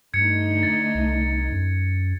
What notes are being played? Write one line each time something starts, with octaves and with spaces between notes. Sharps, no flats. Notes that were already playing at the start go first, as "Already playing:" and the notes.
G2 D3 A3 D#4 G#6 C#7
A6
C2
F#2